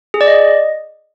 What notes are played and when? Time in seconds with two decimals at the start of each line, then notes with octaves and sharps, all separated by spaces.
0.14 G#4
0.21 D5
0.27 D#5